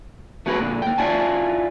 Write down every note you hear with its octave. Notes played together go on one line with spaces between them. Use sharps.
A3 B3 F#4 G#4 A#4 B4
A#2 D3
A#3 G5
E4 F4 D5 G#5 A5